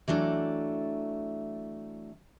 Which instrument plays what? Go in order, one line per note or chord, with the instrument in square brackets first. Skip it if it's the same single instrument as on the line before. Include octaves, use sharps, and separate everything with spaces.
[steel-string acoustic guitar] E3 F#3 A3 D4